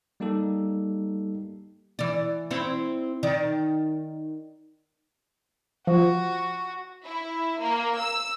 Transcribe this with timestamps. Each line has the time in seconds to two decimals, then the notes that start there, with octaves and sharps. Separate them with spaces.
0.20 G3 A#3 D#4 G4 A4
1.99 E3 D5
2.51 C4 E4 C#5
3.23 D#3 D5
5.87 F3 F#4
7.06 E4
7.62 A#3
7.99 E6